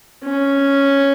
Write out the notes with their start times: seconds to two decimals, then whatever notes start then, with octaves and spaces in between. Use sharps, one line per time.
0.24 C#4